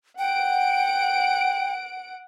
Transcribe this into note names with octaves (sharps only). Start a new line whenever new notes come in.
F#5 G5 D7